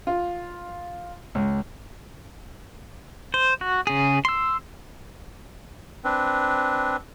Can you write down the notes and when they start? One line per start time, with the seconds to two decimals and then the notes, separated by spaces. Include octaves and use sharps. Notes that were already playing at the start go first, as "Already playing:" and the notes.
0.07 F4
1.35 C#2
3.34 C5
3.61 F#4
3.87 C#3 G#4
4.25 C6 E6
6.04 C4 D4 B4